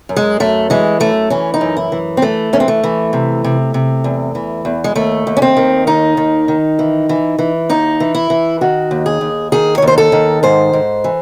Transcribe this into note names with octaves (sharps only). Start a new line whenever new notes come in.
F#2
G#3
F#2 A3
E3 G#3
F#2 A3
E3 C#4
D#4
F#2
E4
E3
C4
E3 A3
E3 C#4
C4
A3
E3
C3
C3
C3
E2
E3
E2
G#3
D#2 A3
D#2
C#4
C4
D#3
D#2 D#4
D#3
D#3
E3
E3
E3
D#2 D#4
E3
E4
E3
D#3 F#4
D#2
G#4
D#2
D#3 G#4
C#5
D#2
C5
A4
D#3
G#2 C5
G#2
E3